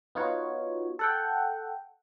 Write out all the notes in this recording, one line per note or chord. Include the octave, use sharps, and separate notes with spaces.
B3 D#4 F4 F#4 C#5
A4 F#5 G5